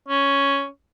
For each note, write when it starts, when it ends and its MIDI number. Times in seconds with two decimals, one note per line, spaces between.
0.08 0.66 61